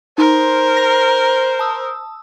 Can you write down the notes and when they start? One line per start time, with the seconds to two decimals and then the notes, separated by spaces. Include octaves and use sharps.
0.18 D#4 A#4 C5 C6
0.77 A#5 A#6
1.59 A5 D#6 E6